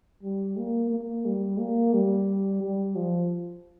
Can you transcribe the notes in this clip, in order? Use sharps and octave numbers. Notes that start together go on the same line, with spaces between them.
G3
A#3
A#3
G3
A#3
G3
G3
F3